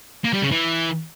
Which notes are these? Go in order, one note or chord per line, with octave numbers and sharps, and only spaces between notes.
A#3
G3
C#3
E3